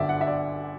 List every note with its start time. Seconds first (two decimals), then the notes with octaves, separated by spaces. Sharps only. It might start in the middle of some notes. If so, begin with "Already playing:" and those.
Already playing: G1 F#2 D3 D5 E5
0.09 F#5
0.21 E5
0.27 D5